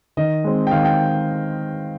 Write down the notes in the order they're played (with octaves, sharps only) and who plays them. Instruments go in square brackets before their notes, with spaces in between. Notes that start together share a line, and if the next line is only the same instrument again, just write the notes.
[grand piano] D#3 D#5
G#3 C4
G5
D#3 F5
G5